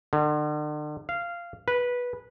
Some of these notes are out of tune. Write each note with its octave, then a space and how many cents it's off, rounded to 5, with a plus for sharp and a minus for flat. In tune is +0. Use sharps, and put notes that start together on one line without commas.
D3 +40
F5 -15
B4 -15